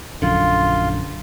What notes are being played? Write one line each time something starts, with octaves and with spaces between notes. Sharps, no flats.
A#1 F#2 D3 F4